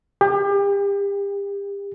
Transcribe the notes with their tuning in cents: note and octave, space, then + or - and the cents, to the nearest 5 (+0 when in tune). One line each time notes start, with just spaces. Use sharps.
G4 +35